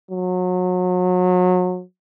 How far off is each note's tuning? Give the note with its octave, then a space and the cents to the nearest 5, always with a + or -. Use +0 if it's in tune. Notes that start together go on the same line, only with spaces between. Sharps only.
F#3 -30